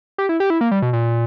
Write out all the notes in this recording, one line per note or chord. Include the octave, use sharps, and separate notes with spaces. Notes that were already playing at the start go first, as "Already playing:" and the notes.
G4
E4
G4
E4
A#3
G3
B2
A#2